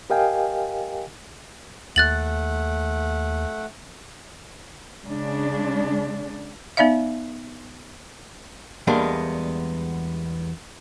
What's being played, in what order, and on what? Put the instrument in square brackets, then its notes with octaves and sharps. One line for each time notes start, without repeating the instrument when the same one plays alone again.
[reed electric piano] G4 A#4 D#5 F5 G5 G#5
[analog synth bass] D#2 [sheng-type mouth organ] A3 F#5 [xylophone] F#6 A6 F#7
[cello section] C#3 G#3 D4
[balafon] B3 D#4 D5 E5 F5
[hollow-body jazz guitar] E2 G3 G#3 A#3 B3 D4